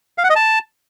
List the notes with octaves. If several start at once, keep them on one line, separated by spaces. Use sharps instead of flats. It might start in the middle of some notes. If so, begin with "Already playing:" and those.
F5
F#5
D#5
A5